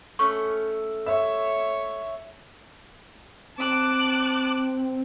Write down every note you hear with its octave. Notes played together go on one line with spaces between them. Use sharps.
A3 C#4 C#6
C#5 E5
C4 A5 D6 F#6